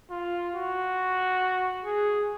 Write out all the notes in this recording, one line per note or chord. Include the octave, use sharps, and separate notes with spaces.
F4
F#4
G#4